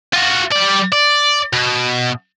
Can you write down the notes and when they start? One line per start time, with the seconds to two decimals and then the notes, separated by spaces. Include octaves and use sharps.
0.13 F4 F#4
0.52 G3 D5
0.92 D5
1.53 B2